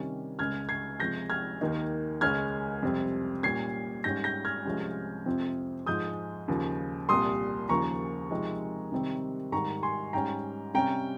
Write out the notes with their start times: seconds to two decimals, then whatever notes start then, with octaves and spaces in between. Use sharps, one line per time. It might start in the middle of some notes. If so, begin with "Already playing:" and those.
Already playing: C3 D#3 G3 C#4
0.39 C#2 C#3 G#3 F6 G#6
0.69 G#6 C7
1.00 C3 F3 G#3 G6 A#6
1.30 F6 G#6
1.61 D#2 D#3 A#3 D#4
2.21 C#2 C#3 G#3 C#4 F6 G#6
2.82 F2 C3 G3 C4
3.43 A#2 G3 C#4 G#6 C7
4.04 G#2 G3 C#4 G6 A#6
4.24 G6 A#6
4.45 F6 G#6
4.65 C2 C3 F3 G#3 C#4
5.26 F2 C3 F3 C4
5.86 G#2 F3 G#3 D#6 G6
6.48 D#2 C#3 F3
7.09 C2 A#2 G3 C6 D#6
7.69 D#2 C#3 F3 A#3 A#5 C#6
8.31 C3 F3 G#3 C4 D#4
8.92 C3 D#3 G3 C4
9.52 G#2 D#3 G3 A#5 C#6
9.83 G#5 C6
10.13 G#2 G3 C#4 G5 A#5
10.74 C3 G3 C#4 G5 A#5